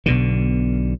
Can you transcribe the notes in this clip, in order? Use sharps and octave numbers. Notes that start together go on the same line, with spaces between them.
B1 B2 D3